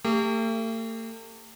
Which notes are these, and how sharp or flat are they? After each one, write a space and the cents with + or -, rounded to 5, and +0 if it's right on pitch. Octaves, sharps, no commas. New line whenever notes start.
A3 +45 G4 +30